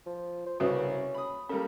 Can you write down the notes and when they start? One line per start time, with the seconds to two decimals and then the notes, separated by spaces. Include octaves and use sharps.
0.06 F3
0.46 C5
0.60 C2 C#3 C#4 F#4 B4
1.15 B5 D#6
1.49 G3 A#3 C#4 A4 A#4